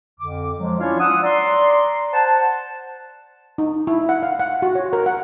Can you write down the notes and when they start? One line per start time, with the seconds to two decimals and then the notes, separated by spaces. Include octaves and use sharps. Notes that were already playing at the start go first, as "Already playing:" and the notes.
0.20 F2 D3 D6
0.58 F3 F#3 G#3
0.80 C#4 D4 E4 F4 C#5 F5
1.00 F#5 D#6 E6
1.23 D5 A#5 C6
2.13 C5 F#5 A5
3.58 D#4
3.87 E4
4.09 F#5
4.23 F5
4.40 F#5
4.62 F#4
4.75 C#5
4.93 A#4
5.06 F#5